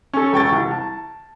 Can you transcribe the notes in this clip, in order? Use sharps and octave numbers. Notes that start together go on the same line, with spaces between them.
C#4 A4
E1 G5 C#6 A6
C2
A5